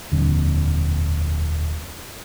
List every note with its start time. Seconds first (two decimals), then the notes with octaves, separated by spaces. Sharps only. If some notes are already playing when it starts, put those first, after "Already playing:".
0.12 D#1 F2 D3